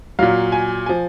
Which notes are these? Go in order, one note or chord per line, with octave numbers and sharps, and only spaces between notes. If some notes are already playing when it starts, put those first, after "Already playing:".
A#2 F#3 F5
G#5
F3 G#5